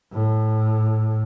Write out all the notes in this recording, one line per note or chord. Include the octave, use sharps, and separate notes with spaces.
A2